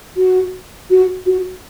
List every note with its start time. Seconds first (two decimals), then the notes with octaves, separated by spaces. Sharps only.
0.17 F#4
0.91 F#4
1.26 F#4